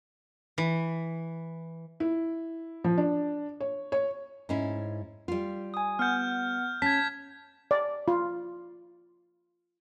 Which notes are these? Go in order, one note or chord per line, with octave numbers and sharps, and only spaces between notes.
E3
E4
F3
D4
C#5
C#5
G#2 C#4 E4
G3 F4
G#5 D#6
B3 F#5 F6 G6
C#4 A5 G#6 B6
D5
F4